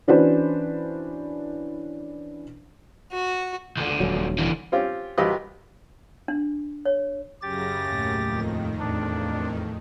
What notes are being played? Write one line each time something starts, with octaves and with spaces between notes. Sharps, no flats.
E3 C#4 D4 F#4 B4 C5
F#4
C#2 D3
D#1 F#3
D3 E3
C4 C#4 F4 G4
C2 F#3 F4 G4 B4 D#5
D4
C#5
F#2 C#3 G4 A6 A#6
D#2 A2
F2 D#3
E2 A2 D4